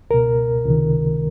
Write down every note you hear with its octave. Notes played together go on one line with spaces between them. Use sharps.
C#2 B2 A#4
C#2 C3 D#3